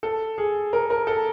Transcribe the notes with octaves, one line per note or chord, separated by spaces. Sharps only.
A4
G#4
A#4
A#4
A4